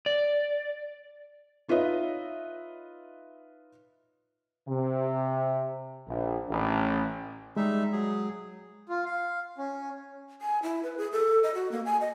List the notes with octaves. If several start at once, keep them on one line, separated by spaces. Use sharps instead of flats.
D5
D#4 F4 B4 C#5 D#5 E5
C3
A#1
A1
G3 G#3 D#4 E5
F#3 G#4
F4
F5
C#4
G#5
E4
B4
G#4
A4
D#5
F#4
A#3
G#5
D#5